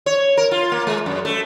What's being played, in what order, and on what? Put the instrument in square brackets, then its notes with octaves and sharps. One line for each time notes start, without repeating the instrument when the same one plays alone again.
[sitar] C#5
A#4
F4
A#3
G#3
F#2
A3